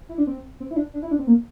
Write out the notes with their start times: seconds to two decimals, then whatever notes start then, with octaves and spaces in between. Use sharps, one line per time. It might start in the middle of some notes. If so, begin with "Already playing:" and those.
0.09 E4
0.18 D4
0.27 C4
0.60 C4
0.71 E4
0.76 D4
0.94 D4
1.02 E4
1.11 D4
1.19 C4
1.27 A#3